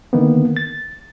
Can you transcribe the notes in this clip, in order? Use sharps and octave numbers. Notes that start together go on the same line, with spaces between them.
D3 D#3 A#3 B3
A6